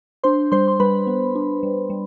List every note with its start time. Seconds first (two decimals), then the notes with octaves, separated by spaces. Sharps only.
0.24 D4 C5 C6
0.52 G3 C5 C6
0.68 C6
0.80 G3 B4 B5
1.07 B3
1.35 D4
1.63 G3
1.90 G3